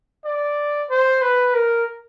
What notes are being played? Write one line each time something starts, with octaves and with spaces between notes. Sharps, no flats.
D5
C5
B4
A#4